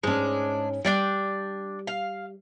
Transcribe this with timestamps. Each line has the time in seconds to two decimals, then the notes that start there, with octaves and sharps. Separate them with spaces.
0.03 G#2 G#3 C#4 D4
0.85 G3 D4 D5 G5
1.87 F5